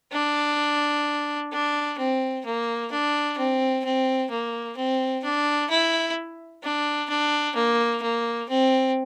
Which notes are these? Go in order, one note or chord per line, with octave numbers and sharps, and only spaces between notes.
D4
D4
C4
A#3
D4
C4
C4
A#3
C4
D4
E4
D4
D4
A#3
A#3
C4